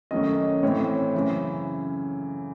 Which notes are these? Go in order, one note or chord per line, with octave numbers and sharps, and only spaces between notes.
F#2 D#3 A3 C#4 D#5
A2 E3 C4 C#5
F#2 C#3 E3